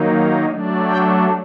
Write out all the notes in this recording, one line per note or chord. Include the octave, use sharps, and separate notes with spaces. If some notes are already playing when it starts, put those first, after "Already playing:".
Already playing: D#3 F#3 A#3 D#4
F#3 A3 D4
G5